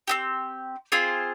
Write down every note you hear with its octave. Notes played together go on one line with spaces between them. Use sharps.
C4 E4 G4
C4 F4 G#4 C5